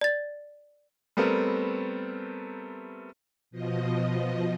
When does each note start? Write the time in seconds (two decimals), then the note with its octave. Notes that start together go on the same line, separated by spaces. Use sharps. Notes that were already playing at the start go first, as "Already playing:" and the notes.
0.01 D5 A6
1.17 G3 A3 B3 C4 A4 A#4
3.51 B2 F3 D#5